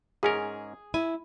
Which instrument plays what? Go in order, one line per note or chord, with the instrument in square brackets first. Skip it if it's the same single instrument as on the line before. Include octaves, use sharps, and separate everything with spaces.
[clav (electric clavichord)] G#2 C#4 A#4 [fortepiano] G#4
[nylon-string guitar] E4 [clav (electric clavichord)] G#5